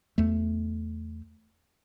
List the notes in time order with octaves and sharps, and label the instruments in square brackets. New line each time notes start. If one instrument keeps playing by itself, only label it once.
[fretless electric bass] E2 A3